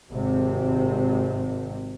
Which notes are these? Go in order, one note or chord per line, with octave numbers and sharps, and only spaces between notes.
G#1 C3